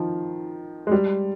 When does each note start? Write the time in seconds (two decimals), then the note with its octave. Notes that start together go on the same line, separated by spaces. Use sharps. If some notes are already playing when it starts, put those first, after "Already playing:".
Already playing: D#3 F3
0.87 G#3
0.91 G3